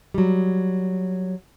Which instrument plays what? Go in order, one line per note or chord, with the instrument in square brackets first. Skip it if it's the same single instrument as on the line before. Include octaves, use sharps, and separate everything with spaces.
[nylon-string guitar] F#3 G3